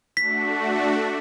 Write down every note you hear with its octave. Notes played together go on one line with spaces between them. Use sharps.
A3 D4 F#4 B6